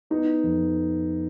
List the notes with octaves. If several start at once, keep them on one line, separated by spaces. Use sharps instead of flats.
B3 D#4
F2